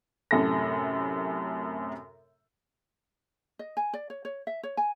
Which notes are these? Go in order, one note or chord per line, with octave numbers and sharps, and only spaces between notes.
F#2 A2 C3 A4 A#6
D#5
G#5
D5
C#5
C#5
E5
C#5
G#5